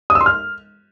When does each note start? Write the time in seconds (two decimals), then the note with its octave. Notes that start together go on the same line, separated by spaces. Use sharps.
0.10 D#6
0.15 E6
0.21 C6
0.26 F6